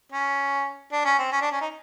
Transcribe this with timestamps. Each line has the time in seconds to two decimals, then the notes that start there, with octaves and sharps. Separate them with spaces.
0.12 C#4
0.92 D4
1.05 C#4
1.19 C4
1.32 C#4
1.41 D4
1.52 C#4
1.61 D#4